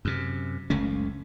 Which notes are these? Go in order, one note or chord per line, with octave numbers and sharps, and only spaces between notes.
F#2 C3
F#1 C#2 A3 C#4